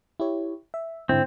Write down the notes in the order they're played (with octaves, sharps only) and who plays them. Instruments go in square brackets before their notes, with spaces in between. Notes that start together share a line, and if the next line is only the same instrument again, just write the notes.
[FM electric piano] E4 G4 C#5
E5
[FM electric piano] G#2 D3 E4 [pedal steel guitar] C4